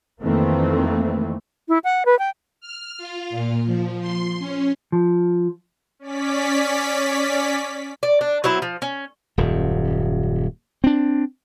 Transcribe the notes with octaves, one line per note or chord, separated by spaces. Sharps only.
F2 D#3 E3 A3 A#3 C4
E4
F#5
B4
G5
F6
F4
A#2
F3
C6
C#4
F3
C#4 D5 B6
D5
D4
F#3 B3 C4 E4
F3
C#4
D#1 F#2
C4 D4